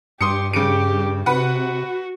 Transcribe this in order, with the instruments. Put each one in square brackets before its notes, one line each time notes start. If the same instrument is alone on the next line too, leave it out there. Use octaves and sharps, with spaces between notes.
[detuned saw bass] G2 [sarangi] G4 [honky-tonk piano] C6 D#6 C#7
[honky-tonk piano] C#3 C#7 D7 [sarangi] G4
[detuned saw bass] C3 [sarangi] F#4 [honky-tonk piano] B4 F#5